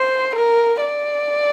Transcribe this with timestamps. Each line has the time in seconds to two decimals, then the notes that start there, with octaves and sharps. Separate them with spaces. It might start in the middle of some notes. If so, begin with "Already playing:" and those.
Already playing: C5
0.35 A#4
0.82 D5